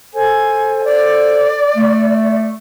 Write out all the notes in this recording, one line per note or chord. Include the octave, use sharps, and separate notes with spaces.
A4 C5 G#5
D5
A3